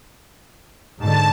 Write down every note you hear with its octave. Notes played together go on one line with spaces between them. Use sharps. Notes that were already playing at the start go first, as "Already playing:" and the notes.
G#2 B2 D3 A5